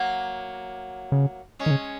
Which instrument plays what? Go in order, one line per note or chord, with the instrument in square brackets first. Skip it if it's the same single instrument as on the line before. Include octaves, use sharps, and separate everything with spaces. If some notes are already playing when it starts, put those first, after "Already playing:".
Already playing: [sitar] F#3 A#3
[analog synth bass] C#3
[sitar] G#3 C#4
[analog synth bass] D#3
C#3